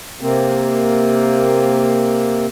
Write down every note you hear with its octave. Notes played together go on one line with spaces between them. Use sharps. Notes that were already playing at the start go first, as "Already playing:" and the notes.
C3 A#3 C4